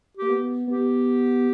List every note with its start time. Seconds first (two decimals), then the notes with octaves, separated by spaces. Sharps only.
0.17 A#3 G4
0.29 B3
0.67 B3 G4